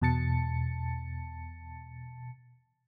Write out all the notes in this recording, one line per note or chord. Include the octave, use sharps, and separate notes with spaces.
E2 B2 A5 A6 C#7